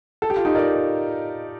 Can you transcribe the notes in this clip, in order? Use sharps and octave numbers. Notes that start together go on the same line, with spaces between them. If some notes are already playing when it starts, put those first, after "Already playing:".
A4
G4
F4
D#4 G4
A#4 D5